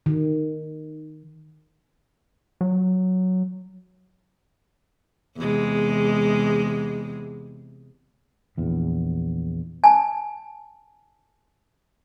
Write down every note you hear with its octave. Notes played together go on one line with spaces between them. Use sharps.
D#3
F#3
E2 C3 G#3
A#1 E2
G#5 A5